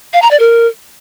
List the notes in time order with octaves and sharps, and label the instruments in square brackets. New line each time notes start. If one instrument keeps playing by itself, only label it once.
[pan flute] F5
A#5
D5
A#4